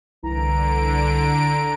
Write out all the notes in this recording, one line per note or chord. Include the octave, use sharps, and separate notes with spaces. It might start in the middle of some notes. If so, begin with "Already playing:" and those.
C2 D3 E3 A#5 D7